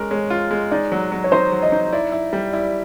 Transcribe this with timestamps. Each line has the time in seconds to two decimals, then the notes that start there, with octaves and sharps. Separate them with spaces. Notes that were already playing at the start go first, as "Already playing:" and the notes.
Already playing: G#3 C#4 A#4
0.11 G#3 C#5
0.30 F4
0.51 G#3
0.71 D#4 D5
0.92 F#3
1.12 F#3
1.24 C#5
1.32 D#4 C5
1.52 F#3
1.62 D#5
1.72 D#4
1.93 E4 D5
2.12 E4
2.33 G3
2.53 E4 D5